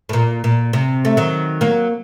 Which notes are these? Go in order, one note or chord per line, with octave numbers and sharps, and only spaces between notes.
A2
A#2
A#2
C3
A3
D#3 F#3
F#3 A#3